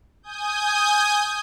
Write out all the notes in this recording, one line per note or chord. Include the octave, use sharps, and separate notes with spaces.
G#5 D#6 G6